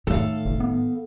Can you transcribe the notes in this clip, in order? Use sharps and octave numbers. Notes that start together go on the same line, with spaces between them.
A2 D#3 A4 F5
F#1
B3